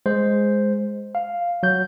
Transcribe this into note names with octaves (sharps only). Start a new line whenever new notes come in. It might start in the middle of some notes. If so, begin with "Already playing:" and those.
G#3 C5
F5
F#3 G6